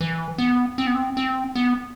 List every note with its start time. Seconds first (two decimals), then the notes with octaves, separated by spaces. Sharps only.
0.01 E3
0.38 B3
0.78 C4
0.87 B3
0.95 C4
1.17 C4
1.55 B3